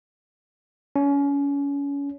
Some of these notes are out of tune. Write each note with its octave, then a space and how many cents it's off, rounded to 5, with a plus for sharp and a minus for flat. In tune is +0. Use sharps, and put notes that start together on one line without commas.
C#4 +30